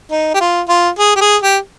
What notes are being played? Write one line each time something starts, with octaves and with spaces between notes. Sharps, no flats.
D#4
G4
F4
F4
G#4
G4
G#4
G4